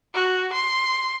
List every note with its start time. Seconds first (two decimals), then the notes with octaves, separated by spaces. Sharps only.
0.14 F#4
0.53 C6